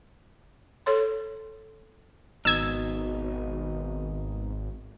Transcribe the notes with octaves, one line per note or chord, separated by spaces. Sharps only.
A4 C#5 C6
G#1 B2 D#4 E6 G#6